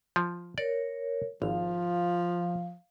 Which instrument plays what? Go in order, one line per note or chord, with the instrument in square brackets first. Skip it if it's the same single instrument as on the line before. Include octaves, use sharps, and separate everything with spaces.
[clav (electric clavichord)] F3
[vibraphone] A#4 C#5 [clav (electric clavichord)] D5
[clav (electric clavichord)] G#1 [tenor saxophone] F3 [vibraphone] F5